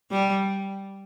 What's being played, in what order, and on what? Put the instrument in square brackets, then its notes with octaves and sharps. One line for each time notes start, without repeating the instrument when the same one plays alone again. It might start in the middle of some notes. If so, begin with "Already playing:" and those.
[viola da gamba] G3